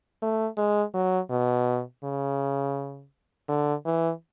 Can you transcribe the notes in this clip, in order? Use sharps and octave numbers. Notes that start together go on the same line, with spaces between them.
A3
G#3
F#3
B2
C#3
D3
E3